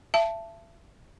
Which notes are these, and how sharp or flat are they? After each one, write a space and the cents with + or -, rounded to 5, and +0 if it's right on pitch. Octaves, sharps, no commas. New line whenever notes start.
E5 +35 A5 +0